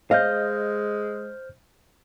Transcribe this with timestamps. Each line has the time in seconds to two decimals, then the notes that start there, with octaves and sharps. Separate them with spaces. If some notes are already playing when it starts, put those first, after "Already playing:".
0.11 G#3 C5 D#5 F5 F6 G6